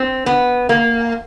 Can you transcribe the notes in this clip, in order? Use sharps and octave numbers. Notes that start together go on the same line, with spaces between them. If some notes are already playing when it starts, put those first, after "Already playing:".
Already playing: C4
B3
A#3